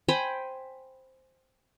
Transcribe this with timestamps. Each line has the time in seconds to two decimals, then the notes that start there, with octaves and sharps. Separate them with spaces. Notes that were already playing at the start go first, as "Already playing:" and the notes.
0.08 C5 G5 G#5 B5